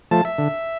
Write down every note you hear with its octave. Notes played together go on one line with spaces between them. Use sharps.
F3 A3 A5
E5
D3